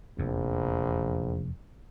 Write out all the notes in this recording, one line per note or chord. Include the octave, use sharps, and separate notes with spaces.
F1 A#1 E2